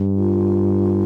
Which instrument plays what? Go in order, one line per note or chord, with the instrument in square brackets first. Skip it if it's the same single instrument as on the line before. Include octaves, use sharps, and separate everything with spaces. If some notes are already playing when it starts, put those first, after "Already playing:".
Already playing: [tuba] G2
[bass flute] F4